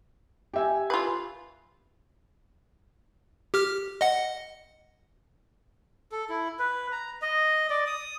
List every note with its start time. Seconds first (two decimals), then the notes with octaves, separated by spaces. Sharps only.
0.54 G4 E5 G#5
0.90 F4 B4
3.54 G4 F6
4.01 D#5 F#5
6.12 A4
6.29 E4
6.59 B4
6.92 A#5
7.22 D#5
7.70 D5
7.87 D#6